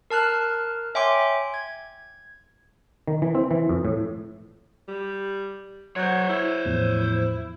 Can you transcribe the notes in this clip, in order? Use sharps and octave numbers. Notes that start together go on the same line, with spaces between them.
A#4 A5 F6 F#6
C#5 E5 G5 G#5 C6 D6
G#6
D#3
E3
C4
E3
F2
A2
G3
F#3 C5 C#5
E4
E2 A2 F3